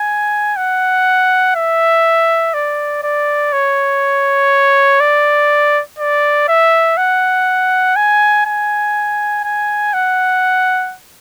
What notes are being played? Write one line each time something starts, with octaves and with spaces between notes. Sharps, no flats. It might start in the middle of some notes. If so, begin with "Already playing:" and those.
Already playing: G#5
F#5
E5
D5
D5
C#5
D5
D5
E5
F#5
G#5
G#5
G#5
F#5